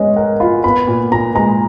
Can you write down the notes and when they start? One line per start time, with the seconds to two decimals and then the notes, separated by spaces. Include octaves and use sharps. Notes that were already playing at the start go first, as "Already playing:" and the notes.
Already playing: G#3 B3 C#4 C#5 D#5
0.16 A#4 F#5
0.40 F4 B5
0.64 B3 B5
0.87 A#2
1.11 A#2 A#5
1.35 G#3 A#5